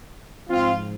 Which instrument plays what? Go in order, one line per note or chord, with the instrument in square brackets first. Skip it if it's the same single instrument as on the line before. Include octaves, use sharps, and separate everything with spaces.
[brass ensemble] G#2 F3 C4 F4